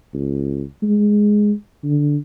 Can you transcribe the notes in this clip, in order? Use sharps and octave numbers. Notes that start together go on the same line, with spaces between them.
C#2
G#3
D3